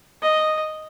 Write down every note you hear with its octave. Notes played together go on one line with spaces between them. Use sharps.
D#5